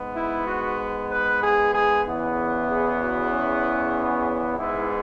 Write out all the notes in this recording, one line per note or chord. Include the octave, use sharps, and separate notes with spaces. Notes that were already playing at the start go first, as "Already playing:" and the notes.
Already playing: G#2 G#3 B3
E4
F#4
B4
G#4
G#4
E2 C#3 E3 B3
G#4
F#4
C#4
G#2 G#3 B3 E4